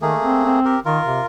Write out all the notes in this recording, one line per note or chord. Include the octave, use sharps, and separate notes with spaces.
D#3 A3 A#3 G#4
C4
C4
G4 A#4
D#3 F4 A#4
C3